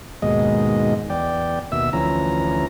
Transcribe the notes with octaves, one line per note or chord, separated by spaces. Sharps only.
D#2 G#2 B2 G#3 D#5
E2 D5 G5
D#2 B2 E5 E6
D2 E3 F3 C#4 A#5